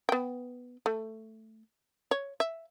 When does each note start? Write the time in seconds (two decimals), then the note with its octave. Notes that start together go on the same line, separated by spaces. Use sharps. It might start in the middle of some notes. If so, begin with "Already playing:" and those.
0.09 B3 G5
0.86 A3
2.11 C#5
2.40 E5